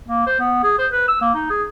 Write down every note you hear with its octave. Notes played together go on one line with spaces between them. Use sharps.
A#3
C5
B3
G#4
C5
B4
E6
A#3
D#4
G#4